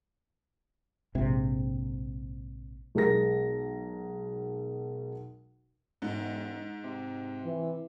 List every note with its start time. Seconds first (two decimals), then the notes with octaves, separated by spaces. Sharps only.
1.15 A#1 G#2 C3
2.95 B1 G#3 A#4 A#6
6.02 E1 G#2
6.84 C3
7.45 E3